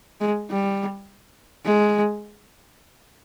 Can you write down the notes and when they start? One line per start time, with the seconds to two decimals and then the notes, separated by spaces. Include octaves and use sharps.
0.21 G#3
0.50 G3
1.65 G#3